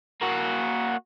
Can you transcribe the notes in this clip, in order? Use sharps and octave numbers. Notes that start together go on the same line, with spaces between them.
A#3 F#4